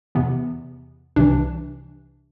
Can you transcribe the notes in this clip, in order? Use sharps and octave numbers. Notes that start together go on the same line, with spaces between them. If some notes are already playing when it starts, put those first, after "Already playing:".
E2 C3 E3 B3
C2 C3 E3 D4